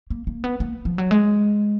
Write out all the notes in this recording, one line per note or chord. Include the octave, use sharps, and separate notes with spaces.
A#3
A#3
B3
A#3
F3
F#3
G#3